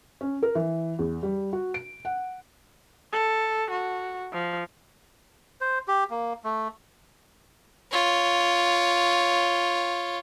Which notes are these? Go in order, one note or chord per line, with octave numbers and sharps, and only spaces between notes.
C#4
A#4
E3
E2
G3
F#4
D7
F#5
A4
F#4
F3
C5
G4
A#3
A3
F4 C#5